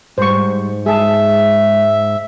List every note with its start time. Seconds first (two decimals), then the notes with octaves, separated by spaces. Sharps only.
0.18 G#2 G3 C5 C#6
0.86 G#3 G#4 E5 A5